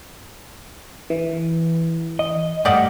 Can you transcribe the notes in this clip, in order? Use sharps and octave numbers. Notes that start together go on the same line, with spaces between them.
E3
D#5
G2 A3 G4 D5 D#5 F#5